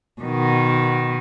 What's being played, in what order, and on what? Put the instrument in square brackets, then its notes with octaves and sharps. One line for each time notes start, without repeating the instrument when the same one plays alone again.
[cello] B2 D#3